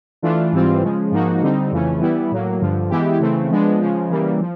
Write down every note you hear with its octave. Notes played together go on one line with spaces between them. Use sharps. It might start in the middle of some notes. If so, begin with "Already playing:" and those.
E3 A3 D4 F4
G#2 E3 G3 C4 F4
C#3 F3 G#3
G#2 F3 A#3 D#4 F#4
D3 G3 C4 D#4
F2 C#3 E3 A3 C#4
E3 G3 B3 E4
A2 F#3 A#3
G2 D3 F3
E3 G#3 B3 E4 G4
C#3 E3 A3 C4
F3 G#3 B3 D4
C#3 F3 G#3
C#3 E3 G3 A#3
F3